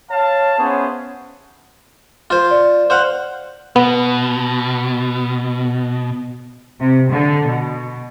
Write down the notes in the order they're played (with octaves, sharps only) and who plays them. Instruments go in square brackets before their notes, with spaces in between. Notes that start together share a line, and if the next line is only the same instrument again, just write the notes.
[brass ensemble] C#5 F5 A5
B3 C#4 E4 G#4 C5 C#5
[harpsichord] F4 C5
[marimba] D5
[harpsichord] C5 F5 F#5
[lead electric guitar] B2 [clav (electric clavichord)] B3
[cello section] C3
D3
B2